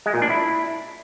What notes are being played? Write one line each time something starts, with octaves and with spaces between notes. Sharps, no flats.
G#3
A#2
D4
E4